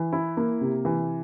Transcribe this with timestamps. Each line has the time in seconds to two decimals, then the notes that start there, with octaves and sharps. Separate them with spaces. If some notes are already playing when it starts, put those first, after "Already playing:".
Already playing: E3
0.13 E4
0.37 A#3
0.61 C3
0.85 E3